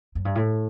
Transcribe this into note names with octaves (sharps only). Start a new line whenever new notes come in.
F#2
G2
A2